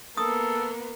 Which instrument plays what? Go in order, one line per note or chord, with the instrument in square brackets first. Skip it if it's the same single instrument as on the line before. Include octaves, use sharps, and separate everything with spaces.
[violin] A#3 B3 [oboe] A4 [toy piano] D#6